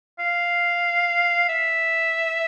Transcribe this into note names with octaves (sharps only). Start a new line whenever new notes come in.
F5
E5